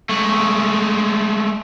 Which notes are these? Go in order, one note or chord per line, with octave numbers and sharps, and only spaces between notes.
G#3 A3